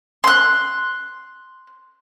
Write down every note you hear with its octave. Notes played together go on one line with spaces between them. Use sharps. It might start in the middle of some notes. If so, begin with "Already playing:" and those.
C6 F#6